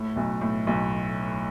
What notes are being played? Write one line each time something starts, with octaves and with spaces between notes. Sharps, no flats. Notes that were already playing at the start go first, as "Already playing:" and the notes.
Already playing: A2
B1 B2
A2
B1 B2